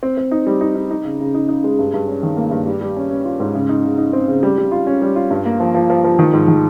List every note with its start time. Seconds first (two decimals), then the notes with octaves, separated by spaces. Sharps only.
0.03 C4
0.17 C4
0.31 D#4
0.47 G3
0.61 D#4
0.75 D#4
0.91 D#4
1.05 C#3
1.20 C#3
1.34 D#4
1.49 D#4
1.64 G#3
1.79 G2
1.94 G2
2.08 C#4
2.23 D#3
2.37 A#3
2.51 G2
2.66 G3
2.81 G3
2.96 C#4
3.10 C#4
3.25 F4
3.40 G#2
3.55 C#3
3.69 D#4
3.84 C#3
3.98 D#4
4.13 C4
4.28 C#3
4.43 G3
4.58 G3
4.72 F4
4.87 C#4
5.02 G3
5.16 F4
5.31 G2
5.46 A#3
5.60 F3
5.74 F3
5.90 F3
6.04 F3
6.19 D#3
6.33 G#2
6.48 D#3